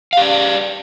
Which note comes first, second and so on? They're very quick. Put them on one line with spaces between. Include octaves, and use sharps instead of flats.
F5 G4 D5